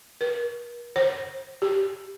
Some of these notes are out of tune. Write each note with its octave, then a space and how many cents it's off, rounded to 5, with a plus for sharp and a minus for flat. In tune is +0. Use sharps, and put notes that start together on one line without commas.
A#4 +45
C5 +25
G4 +0